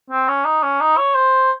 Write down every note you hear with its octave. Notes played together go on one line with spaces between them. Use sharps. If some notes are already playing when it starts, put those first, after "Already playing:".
C4
C#4
D#4
C#4
D#4
C#5
C5